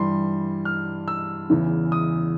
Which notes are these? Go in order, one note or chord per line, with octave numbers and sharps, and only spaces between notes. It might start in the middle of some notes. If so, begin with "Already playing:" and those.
Already playing: G2 E3 G3 C6
F6
E6
E2 C#3 E3
D#6